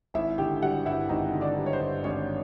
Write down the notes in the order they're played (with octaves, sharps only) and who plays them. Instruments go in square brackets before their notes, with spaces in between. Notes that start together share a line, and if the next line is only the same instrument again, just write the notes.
[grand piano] G#1 E4 E5
D3 G4 G5
G3 F#4 F#5
G2 E4 E5
G#1 D#4 D#5
D3
D4 D5
G3
C#5
C5
G2
G#1 C#4 C#5